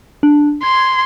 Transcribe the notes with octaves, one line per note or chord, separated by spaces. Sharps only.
D4
C6 G#6